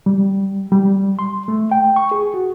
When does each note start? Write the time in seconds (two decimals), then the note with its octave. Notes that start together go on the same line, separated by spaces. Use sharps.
0.06 G3
0.72 G3
1.19 C6
1.48 A3
1.71 G5
1.96 C#6
2.11 G#4
2.34 F#4